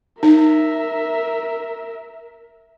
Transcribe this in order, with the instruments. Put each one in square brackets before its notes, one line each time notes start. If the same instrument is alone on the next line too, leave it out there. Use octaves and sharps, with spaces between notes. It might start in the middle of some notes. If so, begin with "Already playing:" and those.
[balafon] D#4 [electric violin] A#4 E5